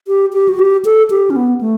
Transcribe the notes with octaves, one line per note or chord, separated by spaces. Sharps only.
G4
G4
F#4
G4
A4
G4
C#4
B3
A3